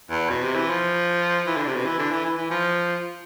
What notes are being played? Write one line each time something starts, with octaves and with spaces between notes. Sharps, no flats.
E2
B2
C3
E3
F3
E3
D3
C3
B2
E3
D3
E3
E3
E3
F3